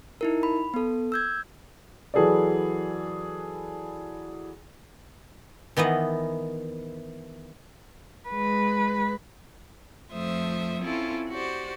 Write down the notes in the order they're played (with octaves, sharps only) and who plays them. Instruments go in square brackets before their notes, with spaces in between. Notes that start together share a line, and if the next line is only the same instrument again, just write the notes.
[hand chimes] D#4 E4 A#4
B5
B3 A4
E6 G6 G#6
[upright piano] E3 F#3 G#4 A4 B4 D5
[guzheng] D#3 E3 B3 D#5
[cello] G#3 B4
[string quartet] F2 F3 A3 C5 E5 D#6
C4 C#4 E4 F4 A4
F#4 G4 C5 D5